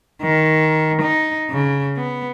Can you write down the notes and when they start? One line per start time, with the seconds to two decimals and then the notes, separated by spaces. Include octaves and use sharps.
0.22 D#3
1.02 D#4
1.50 C#3
1.96 B3